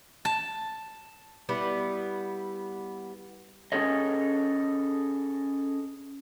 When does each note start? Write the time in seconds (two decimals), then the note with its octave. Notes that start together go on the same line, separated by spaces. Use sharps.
0.25 A5
1.49 G3 B3 E4
3.72 C#4 G#4 A4 C#5 D#5